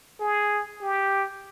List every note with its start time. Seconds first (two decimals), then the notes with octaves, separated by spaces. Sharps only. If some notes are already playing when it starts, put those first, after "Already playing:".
0.20 G#4
0.82 G4